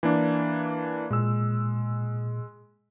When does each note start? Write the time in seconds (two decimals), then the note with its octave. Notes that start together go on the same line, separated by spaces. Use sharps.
0.03 E3 A#3 D4
1.11 A#2 G#3 E6